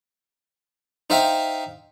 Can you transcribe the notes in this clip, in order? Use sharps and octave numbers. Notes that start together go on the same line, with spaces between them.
D#4 C5 E5 F5 G5